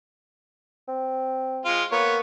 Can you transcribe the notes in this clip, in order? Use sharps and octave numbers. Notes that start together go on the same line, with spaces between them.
C4
G#3 F4
A#3 B3 C#5